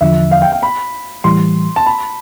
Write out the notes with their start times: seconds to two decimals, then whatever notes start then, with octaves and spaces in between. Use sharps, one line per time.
0.01 E2 D3 F3 E5
0.31 F5
0.42 G5
0.52 G5
0.63 B5
1.24 A2 E3 G3 C6
1.76 A5
1.86 B5